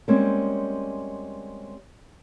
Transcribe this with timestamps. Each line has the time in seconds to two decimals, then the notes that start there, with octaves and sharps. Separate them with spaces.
0.08 G3 G#3 A#3 C4 C#4